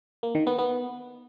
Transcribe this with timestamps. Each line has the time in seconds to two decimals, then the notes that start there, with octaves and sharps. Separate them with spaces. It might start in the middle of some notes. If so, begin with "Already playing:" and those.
0.23 A#3
0.35 D#3
0.47 B3
0.58 B3